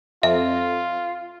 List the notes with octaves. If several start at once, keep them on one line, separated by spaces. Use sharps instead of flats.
F2 F4 E5